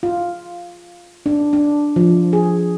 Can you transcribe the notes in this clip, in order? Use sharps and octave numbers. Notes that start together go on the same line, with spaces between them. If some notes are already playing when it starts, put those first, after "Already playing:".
F4
D4
D4
F3
G#4